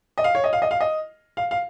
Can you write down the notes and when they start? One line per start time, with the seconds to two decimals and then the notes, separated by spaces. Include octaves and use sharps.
0.18 D#5
0.24 F5
0.35 C#5
0.44 D#5
0.53 F5
0.62 D#5
0.71 F5
0.80 D#5
1.37 F5
1.51 F5